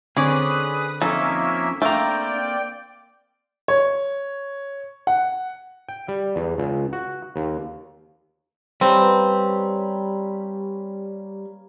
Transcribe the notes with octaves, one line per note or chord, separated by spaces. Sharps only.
D3 C4 C#4 G#4 B4 D5 D#6
F2 F3 A#3 C#4 D#4 A4 E5
A3 A#3 C4 D4 D5 F5 G5 A#5
C#5
F#5
G5
G3
E2
C#2
F#4
D#2
G3 A#3 C4 C#4 B4